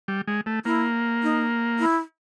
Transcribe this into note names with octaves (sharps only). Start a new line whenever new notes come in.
G3
G#3
A3
A#3 E4
D#4
E4